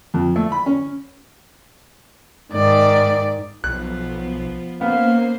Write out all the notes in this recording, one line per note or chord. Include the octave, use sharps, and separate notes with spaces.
F2
A3
B5
C#4
G#2 D#3 D5
B1 F3 B3 F#6
A#3 B3 C#4 C5 F5